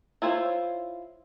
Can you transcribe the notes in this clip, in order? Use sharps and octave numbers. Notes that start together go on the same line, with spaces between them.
E4 F4 C5 C#5